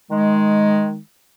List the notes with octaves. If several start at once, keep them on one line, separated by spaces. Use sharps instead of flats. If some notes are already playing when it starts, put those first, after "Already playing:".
D#3 G#3